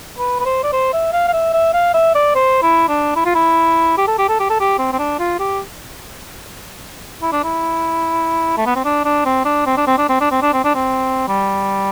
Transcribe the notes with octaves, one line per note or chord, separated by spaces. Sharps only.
B4
B4
C5
D5
C5
E5
F5
F5
E5
E5
F5
E5
D5
C5
E4
D4
E4
F4
E4
G4
A4
G4
A4
G4
A4
G4
C4
C4
D4
F4
G4
E4
D4
E4
A3
B3
C4
D4
D4
C4
D4
C4
D4
C4
D4
C4
D4
C4
D4
C4
D4
C4
G3